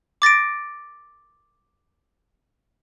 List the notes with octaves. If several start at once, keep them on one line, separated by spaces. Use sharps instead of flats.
D6 A6 A#6 D7